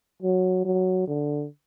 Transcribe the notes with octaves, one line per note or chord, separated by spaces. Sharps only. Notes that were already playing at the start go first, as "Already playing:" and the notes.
F#3
F#3
D3